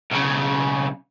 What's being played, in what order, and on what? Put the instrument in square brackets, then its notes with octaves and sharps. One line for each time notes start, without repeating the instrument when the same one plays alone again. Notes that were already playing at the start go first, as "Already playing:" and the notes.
[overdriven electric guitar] B1 C#3